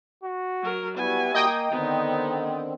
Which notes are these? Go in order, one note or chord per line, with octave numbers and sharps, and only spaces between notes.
F#4
F#3 A#4
G3 B3 E4 F#4 G#5
A#3 D#5 G5 D#6
D3 D#3 B3 C4 D#4